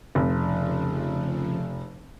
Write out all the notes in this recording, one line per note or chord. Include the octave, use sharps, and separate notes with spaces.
F1 C#3 F3